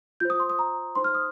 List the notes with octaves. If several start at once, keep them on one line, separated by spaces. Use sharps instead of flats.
F4 C5 G6
D#6
C6
D#6
A#5
D#4 C5 C6
F6
D#6